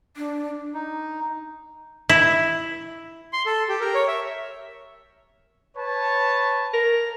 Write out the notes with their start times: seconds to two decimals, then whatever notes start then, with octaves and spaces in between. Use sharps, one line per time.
0.17 D4
0.74 D#4
2.09 E4
3.33 C6
3.46 A4
3.69 G4
3.80 A#4
3.95 C#5
4.08 E5
5.77 B4 C#5 A5
6.73 A#4